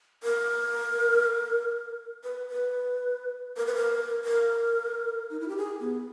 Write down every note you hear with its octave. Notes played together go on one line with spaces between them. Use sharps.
A#4
B4
B4
A#4
B4
A#4
A#4
D#4
E4
G4
G#4
B3